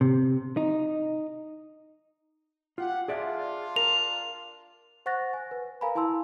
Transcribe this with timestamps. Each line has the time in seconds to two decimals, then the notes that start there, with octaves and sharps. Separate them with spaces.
0.01 C3
0.57 D#4
2.78 F4 G4 F#5
3.08 D4 F4 G#4 D5 E5
3.76 A#4 F7
5.06 C5 F#5 C#6 F#6 A6 A#6
5.33 G#5
5.51 B4
5.81 A#4 F5 G#5 A#5 B5
5.95 E4 G#5 A5 C6 E6